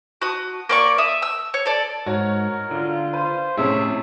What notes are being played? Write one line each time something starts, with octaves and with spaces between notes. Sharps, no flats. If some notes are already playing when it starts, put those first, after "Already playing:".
F#4 D#6
A#3 D5 C#6
E5 D#6
E6
C#5
A4 D5
G#2 F#4 A#4 C#5
D3 F4
B4 C5
F2 A2 C3 C#4 G#4 C#5 E5